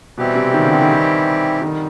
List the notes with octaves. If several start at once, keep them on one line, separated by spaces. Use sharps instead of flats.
B2 E3 G3 C4 E4 G4
C3
D#3
C#3
D3
D#3
F2 D3 D#3 G3